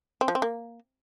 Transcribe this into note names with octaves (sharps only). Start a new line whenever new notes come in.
C4
F3
C4
A#3